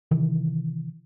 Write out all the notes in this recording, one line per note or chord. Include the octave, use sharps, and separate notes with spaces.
C3 D#3 E3